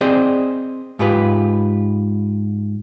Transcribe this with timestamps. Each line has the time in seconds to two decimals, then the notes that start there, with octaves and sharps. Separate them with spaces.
0.01 C4 G#4 C5 D5 D#5
0.99 G#2 F4 G4 B4